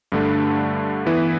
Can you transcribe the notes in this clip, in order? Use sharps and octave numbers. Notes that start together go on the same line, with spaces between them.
G2 D3 A3 D4
E3 B3 E4 B4